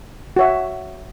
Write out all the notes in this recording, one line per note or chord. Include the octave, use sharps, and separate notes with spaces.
F#4 C#5 E5